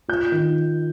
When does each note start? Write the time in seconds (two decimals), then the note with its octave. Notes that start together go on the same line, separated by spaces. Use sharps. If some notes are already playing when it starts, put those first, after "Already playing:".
0.08 F4 G6
0.32 D#3